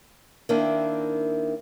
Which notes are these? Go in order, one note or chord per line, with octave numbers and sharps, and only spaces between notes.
D#3 A#3 C4 D4 E4